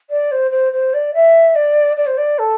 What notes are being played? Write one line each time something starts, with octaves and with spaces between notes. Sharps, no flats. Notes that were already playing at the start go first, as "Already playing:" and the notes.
D5
C5
C5
C5
D5
E5
D5
D5
C5
D5
A4